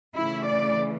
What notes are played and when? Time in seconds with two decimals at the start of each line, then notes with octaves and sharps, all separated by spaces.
0.15 C#3 E3 A3 E4
0.46 D5